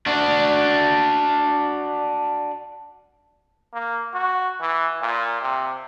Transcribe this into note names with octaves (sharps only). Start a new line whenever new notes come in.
D4 F#4
A#3
F#4
E3
A#2
C3